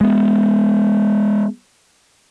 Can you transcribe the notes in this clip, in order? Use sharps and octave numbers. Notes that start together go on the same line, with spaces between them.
G#3 B3